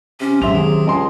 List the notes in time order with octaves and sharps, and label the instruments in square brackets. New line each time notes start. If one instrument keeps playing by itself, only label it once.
[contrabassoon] C3 [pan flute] C#4
[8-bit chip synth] A#1 C6 [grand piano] G#2 E5 F7 [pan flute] F#3
[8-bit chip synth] D#3 [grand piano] G#4
[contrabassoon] C#2 [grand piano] D#5 G#5 C6